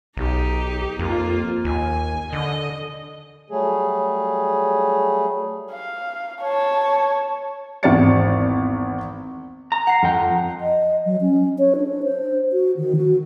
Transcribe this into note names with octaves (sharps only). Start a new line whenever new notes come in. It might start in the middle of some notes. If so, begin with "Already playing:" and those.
B1 D#4 G4
F2 A#3 F4
D#2 G#5
D3 D#5
F#3 G3 A3 G#4
F5
C#5 A5
G#1 E2 C5 D5 A6 C#7
A#5
F#5 C7
F2 G5
D#5
F#3
C#4
C#5
D4
C5
F#4
D#3
F#4